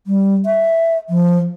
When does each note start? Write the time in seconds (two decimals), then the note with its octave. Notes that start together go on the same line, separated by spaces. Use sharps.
0.07 G3
0.46 E5
1.10 F3